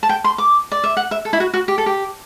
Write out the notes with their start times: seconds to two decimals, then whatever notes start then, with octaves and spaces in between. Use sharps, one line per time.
0.03 A5
0.09 G5
0.24 C6
0.38 D6
0.72 D5
0.84 E5
0.97 F#5
1.11 E5
1.25 A4
1.33 E4
1.40 F#4
1.54 F#4
1.68 G4
1.78 A4
1.86 G4